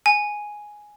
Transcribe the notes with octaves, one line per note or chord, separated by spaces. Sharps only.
G#5